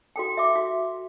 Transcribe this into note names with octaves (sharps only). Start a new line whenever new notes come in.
F#4 A4 G5
E5 D6
F#4